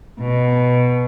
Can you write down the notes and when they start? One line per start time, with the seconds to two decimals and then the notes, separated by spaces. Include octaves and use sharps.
0.20 B2